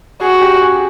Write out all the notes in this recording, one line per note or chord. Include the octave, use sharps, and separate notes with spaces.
F#4 G#4
G4
G#4